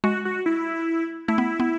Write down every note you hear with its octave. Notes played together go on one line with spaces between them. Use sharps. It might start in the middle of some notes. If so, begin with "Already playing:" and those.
G#3 F#4
F#4
E4
A3 E4
B3
B3